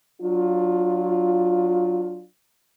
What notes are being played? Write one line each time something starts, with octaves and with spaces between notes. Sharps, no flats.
F#3 D4 F4